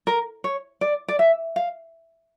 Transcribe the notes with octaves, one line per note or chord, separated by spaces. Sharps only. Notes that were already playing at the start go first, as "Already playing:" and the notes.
A#4
C#5
D5
D5
E5
F5